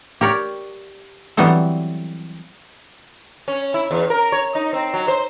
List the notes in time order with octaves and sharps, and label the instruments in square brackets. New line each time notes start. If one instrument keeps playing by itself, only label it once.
[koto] G4 A#4 C#5 D5
E3 F#3 G3 B3 C4 A4
[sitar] C#4
E4
E2
A#4
C#5
D#4
C4
F#3
C5